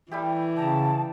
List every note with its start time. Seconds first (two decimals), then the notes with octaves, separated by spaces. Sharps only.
0.11 E3 G3 A3 G4
0.57 C#3 G5 A5 A#5